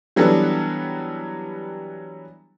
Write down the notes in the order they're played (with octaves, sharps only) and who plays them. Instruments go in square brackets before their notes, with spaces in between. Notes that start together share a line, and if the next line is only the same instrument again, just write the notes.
[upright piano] E3 F#3 G3 B3 D4 A4